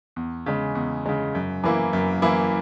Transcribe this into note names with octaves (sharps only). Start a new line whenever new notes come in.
E2
C#3 G#3
E2
C#3 G#3
F#2
E3 A#3 E4
F#2
E3 A#3 E4